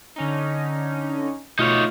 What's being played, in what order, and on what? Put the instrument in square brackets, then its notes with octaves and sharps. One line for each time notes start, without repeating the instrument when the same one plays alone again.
[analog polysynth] D3 C#4 D#4
[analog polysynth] B2 [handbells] A3 F4 F6 [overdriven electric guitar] D#4 C#5